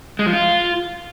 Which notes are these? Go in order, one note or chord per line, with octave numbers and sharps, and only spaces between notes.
G#3
F3
F4